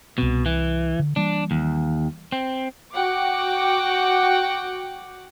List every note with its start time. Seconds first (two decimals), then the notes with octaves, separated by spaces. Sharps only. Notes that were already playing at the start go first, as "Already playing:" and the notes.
0.18 C2 B2 C4
0.46 E3
1.00 D3
1.16 E3 G3 A#3 D4
1.51 D#2
2.32 C4
2.91 F#4 F#5 G5 D6